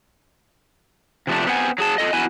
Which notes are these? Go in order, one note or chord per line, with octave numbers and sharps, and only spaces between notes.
C3 F3 A3 D4
A3 B3 C4 C#5 F#5 G#5
F#3 G#4 A5
F4 A4 D#5
B3 E4 F#4 G#5